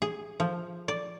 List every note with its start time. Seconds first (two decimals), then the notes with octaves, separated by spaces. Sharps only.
0.02 G#4
0.40 F3
0.88 D5